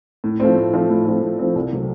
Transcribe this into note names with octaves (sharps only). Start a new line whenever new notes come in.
A2
F3 A3 C4
A2
F3 A3 C4
A2
F3 A3 C4
A2
F3 A3 C4
C2
C3 F#3 A3